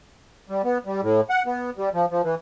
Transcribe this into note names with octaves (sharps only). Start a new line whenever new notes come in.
G3
B3
G3
A2
F#5
B3
G3
F3
F3
E3